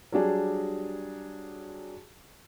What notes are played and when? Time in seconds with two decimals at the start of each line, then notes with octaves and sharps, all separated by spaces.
0.12 F#3 G3 D4 G#4